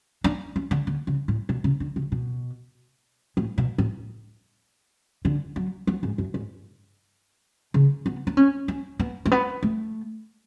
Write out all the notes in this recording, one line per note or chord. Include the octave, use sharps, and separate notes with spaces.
D4
C#4
D3
D3
C#3
A2
B2
C#3
D3
C#3
B2
A2
B2
A2
D3
F#3
F#3
G#2
F#2
G#2
C#3
B3
D4
C#4
C#4
B3
A3
B3
A3